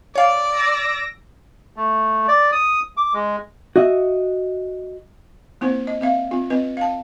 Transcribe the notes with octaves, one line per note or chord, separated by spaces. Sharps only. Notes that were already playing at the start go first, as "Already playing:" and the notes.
C#5 D5 F5
E6 A#6 D7
A3
D5
D#6
D6
G#3
F#4 D#5 E5
A#3 C4 E4 C5
D#5
C4 E5 F5
C4 F4
C4 B4 D#5
F5 A5